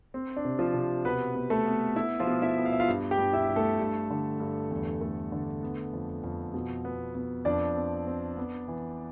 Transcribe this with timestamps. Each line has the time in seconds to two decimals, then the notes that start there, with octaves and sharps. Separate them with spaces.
0.14 C4
0.37 D4
0.45 C3
0.59 F3 F4
0.74 C3
1.05 B2 B3 B4
1.35 B3
1.50 A3 A4
1.66 B3
1.96 B3 E4
2.20 F3 F4
2.27 B2
2.42 E4 E5
2.58 B3
2.65 F5
2.73 E5
2.80 F4 F5
2.88 G2
3.11 G4 G5
3.18 G2
3.33 E4 E5
3.49 G2
3.56 A3 A4
3.80 G2
4.10 D3
4.40 G2
4.71 E2
5.01 A3
5.32 D3
5.63 B3
5.93 F2
6.24 F2
6.54 B2
6.85 B3
7.15 B3
7.45 F2 D4 D5
7.76 C4
8.07 C4
8.37 B3
8.68 E3